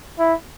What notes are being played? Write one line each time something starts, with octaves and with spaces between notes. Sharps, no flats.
E4